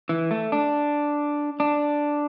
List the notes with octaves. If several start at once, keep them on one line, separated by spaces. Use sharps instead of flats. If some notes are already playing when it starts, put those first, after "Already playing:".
E3
A3
D4
D4